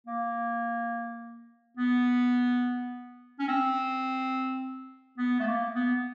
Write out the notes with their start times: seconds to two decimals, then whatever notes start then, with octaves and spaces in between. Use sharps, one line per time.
0.06 A#3
1.77 B3
3.39 C#4
3.48 C4
5.18 B3
5.40 A3
5.47 A#3
5.75 B3